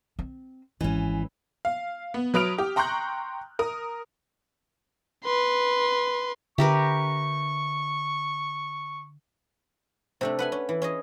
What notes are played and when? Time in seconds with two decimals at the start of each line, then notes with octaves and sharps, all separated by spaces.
0.19 C4
0.81 G#1 E3 C#4
1.65 F5
2.14 B3
2.34 F#3 B4 D#6 F6 D7 F7
2.58 G4
2.76 G5 A#5 C6 C#6 F#6 G6
3.59 A#4 D#6
5.24 B4 C6
6.58 D3 G4 A#4 B4 E5 C#6
10.21 C3 A3 D4
10.39 B4 F#5 G#5
10.52 C#4
10.69 E3
10.82 C#4 G#4 D#5